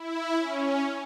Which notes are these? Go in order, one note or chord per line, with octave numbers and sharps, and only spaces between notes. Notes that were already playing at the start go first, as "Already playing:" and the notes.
Already playing: E4
C#4